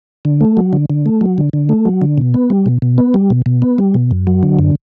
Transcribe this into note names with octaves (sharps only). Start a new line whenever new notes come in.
D3
A3
F#3
D3
D3
A3
F#3
D3
D3
A3
F#3
D3
B2
B3
G3
B2
B2
B3
G3
B2
B2
B3
G3
B2
F#2
F#3
D3
F#2